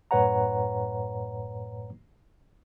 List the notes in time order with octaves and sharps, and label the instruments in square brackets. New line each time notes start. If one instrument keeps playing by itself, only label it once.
[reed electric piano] F#2 A2 B4 C#5 F#5 A#5